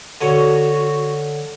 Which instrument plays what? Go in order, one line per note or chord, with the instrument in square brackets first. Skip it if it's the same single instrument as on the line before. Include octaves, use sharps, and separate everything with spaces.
[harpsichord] D3 C#5 [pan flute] F#4